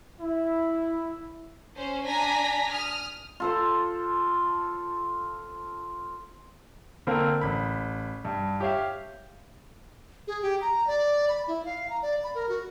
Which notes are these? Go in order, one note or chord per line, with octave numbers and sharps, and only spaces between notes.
E4
C#4 C5
D4 G#5 A#5 A#6 B6
D#6 F6
F4 A4 C5
D3 A#3 C4 A#4
A1 B5
G2
G4 C#5 E5 F5
G#4
G4
A#5
D5
B5
E4
F5
A#5
D5
B5
A#4
F#4